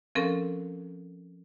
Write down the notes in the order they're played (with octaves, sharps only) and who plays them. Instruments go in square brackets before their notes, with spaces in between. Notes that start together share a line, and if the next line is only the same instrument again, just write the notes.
[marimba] F3 C4 C#4 A4 A#4